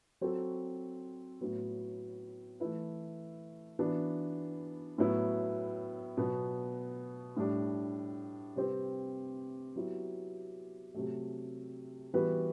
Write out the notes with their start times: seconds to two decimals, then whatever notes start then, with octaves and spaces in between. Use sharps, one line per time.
0.21 F#3 C4 F#4 A4
1.40 A2 F#3 B3 F#4
2.60 E3 A3 E4 B4
3.79 E3 B3 D4 F#4
4.98 A2 F#3 B3 E4
6.17 B2 F#3 B3
7.37 A2 G3 D4
8.56 C3 G3 C4 G4 B4
9.76 F#3 B3 E4 G4
10.94 C3 F#3 A3
12.14 E3 G3 B3 F#4 B4